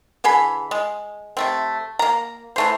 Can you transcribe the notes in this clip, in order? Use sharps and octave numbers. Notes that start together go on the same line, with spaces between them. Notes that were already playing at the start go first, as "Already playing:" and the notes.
D3 E3 G#4 B5
G#3
C3 A3 C4
A#3 A#5
E3 A3 C5